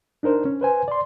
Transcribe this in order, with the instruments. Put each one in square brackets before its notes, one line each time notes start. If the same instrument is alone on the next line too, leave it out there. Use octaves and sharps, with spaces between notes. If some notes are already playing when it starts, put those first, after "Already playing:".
[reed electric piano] D4 D#4 A#4 C5
C#4
B4 C5 G#5
D5 C6